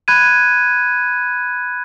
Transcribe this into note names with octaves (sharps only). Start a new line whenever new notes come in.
B5 F#6 G#6 D#7